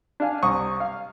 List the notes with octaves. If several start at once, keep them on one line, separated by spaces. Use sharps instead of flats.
D4 F5 G#5
C2 C#6 D#6
F5